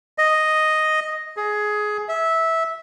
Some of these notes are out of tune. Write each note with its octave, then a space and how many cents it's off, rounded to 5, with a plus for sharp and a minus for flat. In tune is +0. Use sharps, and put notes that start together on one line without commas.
D#5 +0
G#4 +15
E5 -15